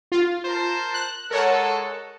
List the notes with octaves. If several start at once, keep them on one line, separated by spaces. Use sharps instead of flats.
F4
A#4 C5 A5
F#6
G#3 A4 A#4 C#5 F#5